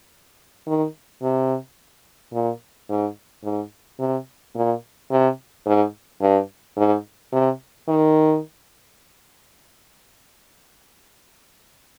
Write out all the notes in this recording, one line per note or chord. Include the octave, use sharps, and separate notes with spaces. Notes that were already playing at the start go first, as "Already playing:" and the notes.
D#3
C3
A#2
G#2
G#2
C3
A#2
C3
G#2
G2
G#2
C3
D#3